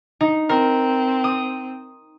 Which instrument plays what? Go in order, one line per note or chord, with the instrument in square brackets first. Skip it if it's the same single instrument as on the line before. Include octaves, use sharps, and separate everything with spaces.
[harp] D#4
[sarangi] C4 [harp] A#4
[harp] D#6